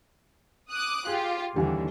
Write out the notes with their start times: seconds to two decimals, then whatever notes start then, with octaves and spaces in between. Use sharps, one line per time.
0.70 D6 D#6 F#6
1.07 F4 G4 G#4
1.56 D#2 D3 E3 G3